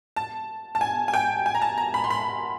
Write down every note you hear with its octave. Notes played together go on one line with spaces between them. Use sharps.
A5
A5
G#5
G#5
G5
G#5
A#5
A5
A#5
B5
C6
B5